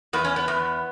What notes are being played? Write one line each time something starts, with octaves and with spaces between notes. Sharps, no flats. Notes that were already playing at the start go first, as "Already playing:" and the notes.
E2 B3
C#4
B3
E2